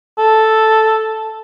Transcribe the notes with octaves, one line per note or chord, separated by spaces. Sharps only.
A4